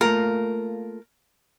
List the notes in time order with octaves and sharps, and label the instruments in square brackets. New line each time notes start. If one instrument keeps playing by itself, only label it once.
[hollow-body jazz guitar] A3 A#3 F4 [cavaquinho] A#4